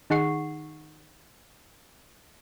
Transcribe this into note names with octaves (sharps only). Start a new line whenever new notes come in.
D#3 D#4 G#4 F#5 C#6 C7